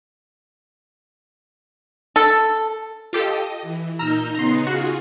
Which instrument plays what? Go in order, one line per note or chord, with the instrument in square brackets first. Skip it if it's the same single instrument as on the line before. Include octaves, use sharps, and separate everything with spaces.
[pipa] A4
[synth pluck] F4 G4 A4 [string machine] D#5
[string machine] E3
[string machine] A#2 D#4 G6 [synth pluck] A#5 E6 F6
[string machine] C#3 B3 D#4 [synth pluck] A#5 C6
[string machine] F4 G#4 F5 [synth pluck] F#4